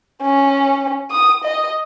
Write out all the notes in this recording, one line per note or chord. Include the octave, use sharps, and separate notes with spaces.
C#4
D#6
D#5